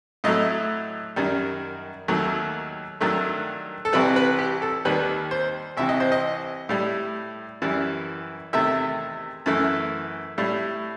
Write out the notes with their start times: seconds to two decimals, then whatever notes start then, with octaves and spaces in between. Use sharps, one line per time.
0.24 A2 F#3 A3 D#5
1.16 F#2 D#3 G3
2.08 D#2 D#3 F#3 A3
3.01 G2 D#3 F#3 A3
3.85 A4
3.93 C2 C3 E3 G3 B4
4.16 B4
4.39 G4
4.62 A4
4.85 D#2 D#3 G3 B4
5.31 C5
5.77 C2 C3 E3 E5
5.89 D#5
6.00 C5
6.12 D#5
6.69 A2 G3
7.62 F#2 E3 G3
8.53 E2 C3 D#3 A3 E5
9.46 F#2 E3 A3
10.38 A2 G3